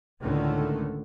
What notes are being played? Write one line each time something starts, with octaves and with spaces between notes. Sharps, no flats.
C#2 A2 D3 D#3 A3